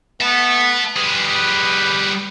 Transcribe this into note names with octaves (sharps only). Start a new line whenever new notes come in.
B3 E5 A5
G3 G#4 B4